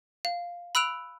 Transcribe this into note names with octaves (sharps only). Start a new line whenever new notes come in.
F5
B5 E6 F#6 D7 F7